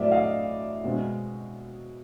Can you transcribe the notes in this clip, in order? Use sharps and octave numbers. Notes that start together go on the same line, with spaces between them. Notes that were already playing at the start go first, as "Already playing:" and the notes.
Already playing: A2 F#3 A3 C4 D5 E5
D#5 F5
B2 G#3 C4